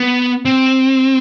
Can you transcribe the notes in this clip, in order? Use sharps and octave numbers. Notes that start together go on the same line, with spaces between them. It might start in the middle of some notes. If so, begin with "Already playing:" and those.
Already playing: B3
C4